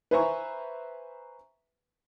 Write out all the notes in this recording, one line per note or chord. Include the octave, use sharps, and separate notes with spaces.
B4 C5 E5 G#5 A#5 C#6